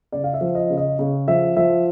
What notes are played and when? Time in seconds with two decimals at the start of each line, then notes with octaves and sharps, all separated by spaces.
0.12 C#3 D5
0.24 F5
0.34 E5
0.41 F3
0.55 D#5
0.70 C#3
0.77 D#5
0.99 C#3
1.28 F3 E5
1.57 F3 E5